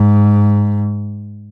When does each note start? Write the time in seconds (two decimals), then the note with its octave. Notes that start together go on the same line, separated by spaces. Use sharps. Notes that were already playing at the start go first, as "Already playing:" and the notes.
Already playing: G#2